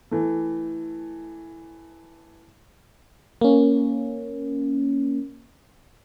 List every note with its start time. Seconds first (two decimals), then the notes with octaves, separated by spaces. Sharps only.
0.11 E3 A3
3.41 A#3 C#4